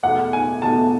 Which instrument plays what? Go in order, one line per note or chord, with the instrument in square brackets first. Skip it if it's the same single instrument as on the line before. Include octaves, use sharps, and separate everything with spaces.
[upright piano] E2 B2 A3 F#5
G#5
E2 B2 A3 A5